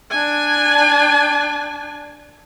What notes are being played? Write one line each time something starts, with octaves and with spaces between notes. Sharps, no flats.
D4 G#5